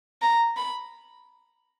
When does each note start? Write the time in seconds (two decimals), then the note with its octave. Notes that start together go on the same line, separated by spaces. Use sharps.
0.21 A#5
0.57 B5